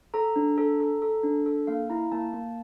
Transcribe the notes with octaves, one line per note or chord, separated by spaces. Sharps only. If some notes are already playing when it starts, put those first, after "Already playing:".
A4 A#5
D4
A4
A4
A4
D4
A4
A#3 F5
E4 A#5
A#3 A5
A#3